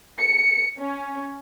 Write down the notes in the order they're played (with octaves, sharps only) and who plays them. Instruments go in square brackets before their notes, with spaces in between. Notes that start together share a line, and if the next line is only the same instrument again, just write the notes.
[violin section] C#7
C#4